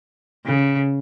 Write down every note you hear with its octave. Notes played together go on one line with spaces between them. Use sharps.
C#3